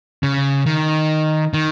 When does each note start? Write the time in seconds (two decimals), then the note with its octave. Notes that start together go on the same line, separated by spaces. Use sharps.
0.23 C#3
0.66 D#3
1.53 D#3